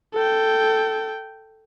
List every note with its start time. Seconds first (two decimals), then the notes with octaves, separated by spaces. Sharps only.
0.14 A4 G5